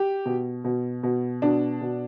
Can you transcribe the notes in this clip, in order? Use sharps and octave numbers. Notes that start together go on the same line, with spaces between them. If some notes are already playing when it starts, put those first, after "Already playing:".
Already playing: G4
B2
B2
B2
B2 D4
B2